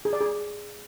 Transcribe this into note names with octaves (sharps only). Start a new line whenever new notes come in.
G#4
D5
G#4